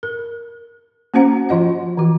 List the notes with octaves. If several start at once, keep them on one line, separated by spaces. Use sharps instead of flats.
A#4
A#3 C#4 F#4 C5 F#5 A#5
F3 F4 D#5 F#5
E3 F#4